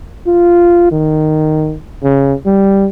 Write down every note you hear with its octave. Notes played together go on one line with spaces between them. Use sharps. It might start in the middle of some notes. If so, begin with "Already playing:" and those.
F4
D#3
C#3
G3